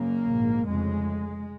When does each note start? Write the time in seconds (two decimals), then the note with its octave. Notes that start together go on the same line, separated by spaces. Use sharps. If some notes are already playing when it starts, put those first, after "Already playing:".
Already playing: F#1 F#2 C#3 A#3
0.29 A#1 G#2
0.68 F1 F2 C#3 G#3